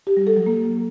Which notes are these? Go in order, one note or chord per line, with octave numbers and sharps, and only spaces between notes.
G4
G3
A4
F#3
A#3